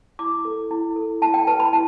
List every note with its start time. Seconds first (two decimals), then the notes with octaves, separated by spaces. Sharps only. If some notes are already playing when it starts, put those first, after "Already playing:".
0.19 E4 D6
0.45 A4
0.71 E4
0.96 A4
1.22 E4 A5
1.34 G5
1.47 G4 B4 A5
1.60 B5
1.73 E4 A5